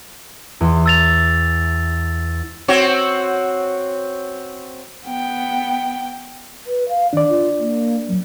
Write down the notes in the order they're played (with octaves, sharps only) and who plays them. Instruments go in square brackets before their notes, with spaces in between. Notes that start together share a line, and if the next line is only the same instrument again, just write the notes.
[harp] E2 C6
[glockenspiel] E6 A6 F7
[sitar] C4 F#4 C#5
[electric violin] B3 G5
[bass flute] B4
F5
[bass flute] D#3 [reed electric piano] D4 D5
[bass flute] F4
A#3
F#3